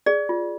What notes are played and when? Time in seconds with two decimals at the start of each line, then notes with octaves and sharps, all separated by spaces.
0.06 G#4 D5
0.29 F4